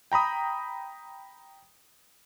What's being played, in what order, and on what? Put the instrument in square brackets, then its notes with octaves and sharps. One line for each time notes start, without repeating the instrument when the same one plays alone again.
[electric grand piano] G5 A#5 B5 D#6